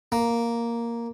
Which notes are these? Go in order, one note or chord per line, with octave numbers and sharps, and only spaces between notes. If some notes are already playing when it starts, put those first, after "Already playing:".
A#3